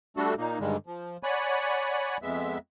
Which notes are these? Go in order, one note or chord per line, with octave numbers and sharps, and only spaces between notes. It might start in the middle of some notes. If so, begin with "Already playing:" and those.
G3 A3 D4 F#4 A4
A#2 A#3 D#4
G2 D3 D#3 G3 G#3
F3
C#5 D5 F#5 G#5 B5
F2 G#3 B3 E5